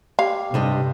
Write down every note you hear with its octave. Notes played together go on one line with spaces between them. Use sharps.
G4 F5
G2 C3 D4 D#5